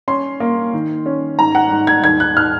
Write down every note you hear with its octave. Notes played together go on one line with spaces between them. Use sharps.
C#4 C6
A#3
D#3
C#4
G#2 A#5
F#5
G#2
G#6
D#2 G#6
F#6
F6